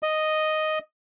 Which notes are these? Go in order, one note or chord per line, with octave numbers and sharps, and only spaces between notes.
D#5